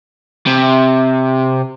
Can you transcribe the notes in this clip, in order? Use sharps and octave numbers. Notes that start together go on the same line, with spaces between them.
C3